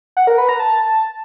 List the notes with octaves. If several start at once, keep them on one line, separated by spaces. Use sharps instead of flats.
F#5
A#4
B4
A#5
A5